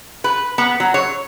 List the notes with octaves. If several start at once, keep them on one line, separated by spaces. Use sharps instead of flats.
B4
B3
F#3
C#5